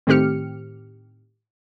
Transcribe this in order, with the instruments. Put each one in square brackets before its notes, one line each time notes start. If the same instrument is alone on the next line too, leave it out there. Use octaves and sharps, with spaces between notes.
[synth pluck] A2 D#3 C4 G4 F6 C#7